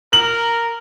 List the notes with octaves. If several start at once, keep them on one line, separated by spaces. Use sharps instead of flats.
A#4 F#7